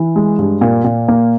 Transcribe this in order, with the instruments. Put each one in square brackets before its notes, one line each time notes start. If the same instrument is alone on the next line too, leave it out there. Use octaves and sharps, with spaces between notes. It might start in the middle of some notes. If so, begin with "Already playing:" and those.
Already playing: [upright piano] E3
G#3
G2
A#2
A#2
A#3